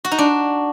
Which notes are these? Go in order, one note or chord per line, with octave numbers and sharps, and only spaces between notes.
F#4
D#4
D4